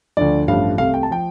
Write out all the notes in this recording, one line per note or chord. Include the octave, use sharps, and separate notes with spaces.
D2 D3 F3 D5
A1 G2 F3 A3 F5
C2 C3 A3 F5
G5
A5
F3 G5